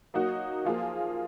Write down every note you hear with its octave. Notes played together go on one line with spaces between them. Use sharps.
F#3 A#3 D#4 F#4
F3 A#3 F4 G#4